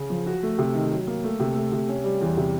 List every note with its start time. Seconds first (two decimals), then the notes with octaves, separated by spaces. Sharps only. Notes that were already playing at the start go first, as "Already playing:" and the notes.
Already playing: C#3
0.10 F3
0.26 F#4
0.43 A3
0.58 C3
0.74 D#3
0.92 F#3
1.07 A#3
1.24 A3
1.40 C3
1.56 A3
1.72 C3
1.89 C#4
2.04 G3
2.21 E2
2.37 C3